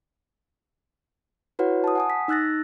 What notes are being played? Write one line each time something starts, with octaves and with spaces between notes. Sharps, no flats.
E4 F#4 B4 C#5 F#5
A5 D#6
F#5 G#5 D#6
B6
D#4 E6 F#6 A6 A#6